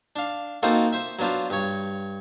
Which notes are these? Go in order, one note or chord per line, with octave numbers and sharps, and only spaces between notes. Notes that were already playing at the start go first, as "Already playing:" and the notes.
D4 F5
A#3 C4 D#4 F4 F#4 A4
C5 E5
F#3 B3 D4 F4 C5
G2 C#5